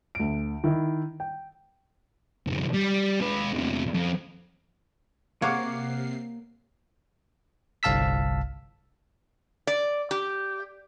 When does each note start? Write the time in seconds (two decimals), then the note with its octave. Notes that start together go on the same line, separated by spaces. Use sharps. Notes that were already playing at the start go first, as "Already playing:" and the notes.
0.15 D2 D7
0.64 D#3 E4
1.20 G5
2.47 C2 F#2
2.74 G3
3.20 G#3 B4
3.53 E2 C3
3.94 F2
5.42 C3 A#3 C#5 F5 F#5 D6 C7
7.83 G1 C2 F5 A5 E6 B6
9.67 D5
10.11 G4